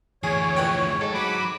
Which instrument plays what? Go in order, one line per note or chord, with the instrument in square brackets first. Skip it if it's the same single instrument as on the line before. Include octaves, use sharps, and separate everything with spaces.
[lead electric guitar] D2 E3 [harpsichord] G#4 [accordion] C#5
[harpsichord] A#1 B4 G5
[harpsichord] G#2 [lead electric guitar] A4
[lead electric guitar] F#3 F#4 [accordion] B5 D6